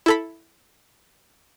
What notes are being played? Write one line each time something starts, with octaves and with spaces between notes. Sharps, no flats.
E4 A4 B5